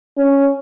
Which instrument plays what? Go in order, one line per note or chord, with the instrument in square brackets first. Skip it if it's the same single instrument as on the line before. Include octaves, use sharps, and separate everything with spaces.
[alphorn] C#4